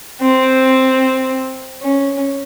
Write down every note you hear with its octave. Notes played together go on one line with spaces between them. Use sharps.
C4
C#4